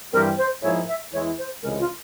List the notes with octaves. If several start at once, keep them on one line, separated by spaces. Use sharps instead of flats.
G2 E3 G3 C4 G4 A#4
C5
G#2 F3 A#3 E4 G#4 C#5
E5
E2 E3 G#3 E4 C#5
C5
C#2 C3 E3 G#3 A#4
F4